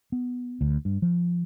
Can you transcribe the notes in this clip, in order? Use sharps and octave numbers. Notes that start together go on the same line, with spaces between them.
B3
D2
G2
F3